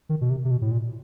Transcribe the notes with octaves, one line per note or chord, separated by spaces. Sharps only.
D#3
B2
C3
C3
B2
A2
A#2